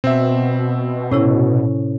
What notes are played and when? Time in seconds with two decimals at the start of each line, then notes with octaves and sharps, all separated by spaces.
0.04 B2 C4 E5
1.12 A2 C3 C#4 E4 C#5